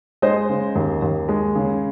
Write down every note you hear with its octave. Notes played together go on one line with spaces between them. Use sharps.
G#3 C5 D#5
C#3
D#2
D#2
G#3
C#3